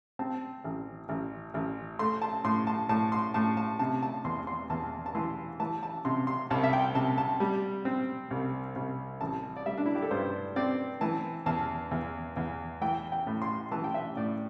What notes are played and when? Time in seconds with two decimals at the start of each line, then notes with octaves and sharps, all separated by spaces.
0.19 C4 A5
0.64 A1
1.09 A1
1.54 A1
1.99 A3 C6
2.22 A5
2.45 A2 C6
2.67 A5
2.89 A2 A5
3.12 C6
3.34 A2 A5
3.57 A5
3.79 C3 A5
4.03 A5
4.24 E2 C6
4.47 C6
4.70 E2 A5
5.06 A5
5.15 E3 C6
5.60 E3 A5
5.83 A5
6.05 C3 C6
6.27 C6
6.50 C2 A5
6.63 E5
6.73 G5
6.95 C3 A5
7.18 A5
7.40 G3
7.85 C4
8.31 C2
8.75 C2
9.21 A1 A5
9.56 D5
9.66 G3 E5
9.78 D4
9.86 E4
9.95 G4
10.02 A4
10.11 G2 C5
10.56 C4 D5
11.01 E3 A5
11.46 E2 A5
11.91 E2
12.36 E2
12.81 E3 G5
13.12 G5
13.27 A2
13.42 C6
13.72 E3 A5
13.84 G5
13.94 E5
14.17 A2 D5